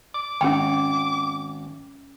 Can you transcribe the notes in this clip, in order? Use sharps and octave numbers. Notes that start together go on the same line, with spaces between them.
D6
G#1 C#4 G5